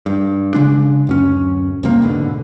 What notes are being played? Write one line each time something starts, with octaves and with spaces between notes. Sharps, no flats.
G2
C#3 G#3 D4
D1 F#2 C#4
E2 G2 C3 A#3
G#2 B2 D3